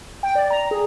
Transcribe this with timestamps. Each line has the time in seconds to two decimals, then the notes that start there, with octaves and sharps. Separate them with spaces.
0.23 G5
0.35 D5
0.50 A#5
0.71 G#4